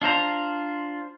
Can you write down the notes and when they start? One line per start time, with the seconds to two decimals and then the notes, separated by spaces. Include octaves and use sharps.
0.02 D4 F4 C5 A#5